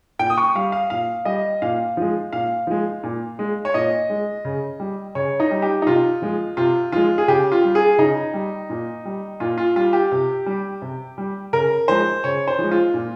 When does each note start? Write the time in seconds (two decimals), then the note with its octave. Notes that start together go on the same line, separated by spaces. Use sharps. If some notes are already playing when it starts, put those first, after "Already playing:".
0.19 A#2 G5
0.30 D#6
0.38 C#6
0.55 G3 F5
0.72 F5
0.90 A#2 F5
1.25 G3 D#5
1.62 A#2 F5
1.97 F3 G#3
2.33 A#2 F5
2.67 F3 G#3
3.03 A#2
3.39 G#3
3.65 C#5
3.74 A#2 D#5
4.10 G#3
4.45 C#3
4.80 G3
5.15 C#3 C#5
5.40 D#4
5.51 G3
5.62 G4
5.82 D#4
5.86 C3 F4
6.22 F3 G#3
6.57 C3 F4
6.92 F3 G#3 F4
7.18 G#4
7.28 C#3 G4
7.52 F4
7.64 G3
7.75 G#4
7.98 C#3 D#4
8.34 G3
8.70 A#2
9.05 G3
9.40 A#2 F4
9.58 F4
9.76 G3 F4
9.93 G4
10.12 C3
10.46 G3
10.82 C3
11.18 G3
11.53 C#3 A#4
11.88 F3 G#3 C5
12.24 C#3 C#5
12.48 C5
12.58 F3 G#3
12.71 F4
12.94 A#2